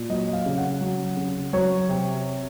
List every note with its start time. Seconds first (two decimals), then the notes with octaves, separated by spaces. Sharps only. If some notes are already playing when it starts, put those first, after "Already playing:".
Already playing: A#2
0.10 F#3 D#5
0.33 F5
0.46 C#3
0.58 F#5
0.81 F#3
1.17 C#3
1.53 F#3 C#5
1.89 C3